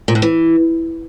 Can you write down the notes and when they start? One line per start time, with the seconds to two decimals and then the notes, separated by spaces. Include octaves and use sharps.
0.08 A#2
0.15 A2
0.22 E3